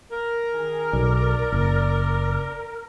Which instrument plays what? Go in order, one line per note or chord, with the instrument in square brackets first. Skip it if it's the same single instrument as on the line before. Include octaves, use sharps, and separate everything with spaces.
[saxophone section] A#4
[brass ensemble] D#3 G#4 G#5
[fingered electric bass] B1 [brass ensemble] D5
[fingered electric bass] F#1